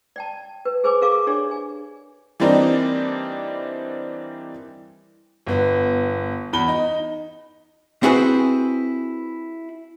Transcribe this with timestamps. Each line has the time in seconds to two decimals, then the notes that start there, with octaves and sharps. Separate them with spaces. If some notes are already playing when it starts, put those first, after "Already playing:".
0.16 D5 G5 A5
0.65 B4
0.84 G#4 B4 C5 G#5 D6
1.02 G#4 A#4 F5 C#6 D6
1.27 D4 G4 G#4 C#5 D5
1.51 G#5
2.40 E3 G3 A#3 C4 D4 D#4
5.47 G1 B3
6.53 E2 B5 G7
6.68 D#4
8.03 C4 E4 F#4 G#4 B4 C5